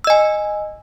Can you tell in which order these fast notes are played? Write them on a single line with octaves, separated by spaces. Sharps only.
E6 D#5 G#5